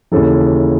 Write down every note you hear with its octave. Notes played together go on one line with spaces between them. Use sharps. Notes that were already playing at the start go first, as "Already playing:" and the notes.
D#2 C#3 E3 A4